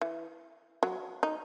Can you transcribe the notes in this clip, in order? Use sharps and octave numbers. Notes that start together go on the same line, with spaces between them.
E3
F#3
D#4